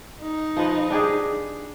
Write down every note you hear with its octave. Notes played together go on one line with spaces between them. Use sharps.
D#4
F3 B4
D4 G4 G#4